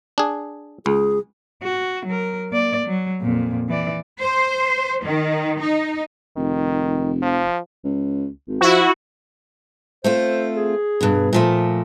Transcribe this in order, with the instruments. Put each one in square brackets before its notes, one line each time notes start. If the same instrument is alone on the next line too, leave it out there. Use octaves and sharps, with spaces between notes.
[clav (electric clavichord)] D4 G#4
[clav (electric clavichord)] C#2 [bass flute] G#4
[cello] F#4
F#3 A#4
A#3 D5
F#3
F2 A#2
E3 D5
[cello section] C5
D#3
D#4
[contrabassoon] F1 [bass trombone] D#3
[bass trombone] F3
[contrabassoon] C#2
G#1
[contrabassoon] F3 [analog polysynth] E4 F#4
[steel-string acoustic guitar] A3 C4 F4 [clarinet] C5
[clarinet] G#4
[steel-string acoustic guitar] G2 B2
A#2 F3 A3